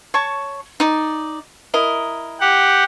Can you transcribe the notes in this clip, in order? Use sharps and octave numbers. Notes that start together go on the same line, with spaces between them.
C#5 A5 C#6
D#4 D5
E4 A#4 D#5
G4 F#5